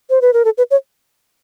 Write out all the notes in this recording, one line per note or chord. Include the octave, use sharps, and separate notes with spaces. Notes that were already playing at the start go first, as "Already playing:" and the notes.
C5
B4
A#4
A4
B4
C#5